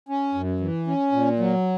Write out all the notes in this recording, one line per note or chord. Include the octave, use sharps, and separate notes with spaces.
C#4
F#2
E3
C#4
A#2
F#3